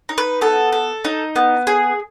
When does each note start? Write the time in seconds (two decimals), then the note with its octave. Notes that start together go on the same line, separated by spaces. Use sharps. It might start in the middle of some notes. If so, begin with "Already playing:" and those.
0.09 D#4
0.18 B4
0.41 B3 A4
0.73 A4
1.05 D#4
1.36 B3
1.67 G#4